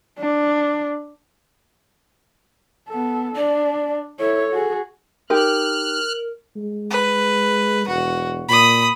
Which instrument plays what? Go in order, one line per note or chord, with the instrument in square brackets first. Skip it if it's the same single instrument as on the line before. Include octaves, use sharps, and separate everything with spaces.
[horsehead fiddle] D4
B3 A4
[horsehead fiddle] D4 [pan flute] D5
[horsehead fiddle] E4 C#5 [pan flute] A4
[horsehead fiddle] F#4 G#4
[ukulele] D#4 G4 [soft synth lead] A#4 [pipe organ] F6 F#6
[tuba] G#3
[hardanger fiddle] B4
[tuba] E1 [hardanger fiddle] F#4
[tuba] A#2 [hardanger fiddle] B5 D#6